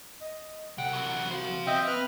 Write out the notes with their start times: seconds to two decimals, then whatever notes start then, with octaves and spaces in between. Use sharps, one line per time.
0.21 D#5
0.78 C2 F#5 G5
0.93 E3 F#3
1.31 F#4 C5 F5
1.67 C4 D#5 E5 G5
1.87 B4 B5 F6